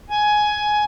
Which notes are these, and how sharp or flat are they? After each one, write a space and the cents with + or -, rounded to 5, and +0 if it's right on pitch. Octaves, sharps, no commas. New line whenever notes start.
G#5 +15